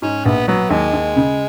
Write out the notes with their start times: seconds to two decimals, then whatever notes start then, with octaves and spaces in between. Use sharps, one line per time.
0.02 G#2 C#4
0.25 A#1 B3
0.48 F#3 B3
0.70 D#2 G#3
0.93 D#2
1.16 C#3